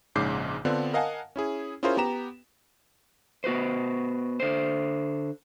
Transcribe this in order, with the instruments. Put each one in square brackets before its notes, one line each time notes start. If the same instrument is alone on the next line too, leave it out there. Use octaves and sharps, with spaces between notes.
[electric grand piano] A#1 G#2 C#3 D6 G6 C7
D3 B3 C4 D4 F4
A#4 D#5 F5 F#5 G#5 A5
C#4 E4 G#4
C#4 E4 F4 G#4 A#4 C5
B3 G4 A#5 E7
[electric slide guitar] B3 F#4 B4 C5
D3 C5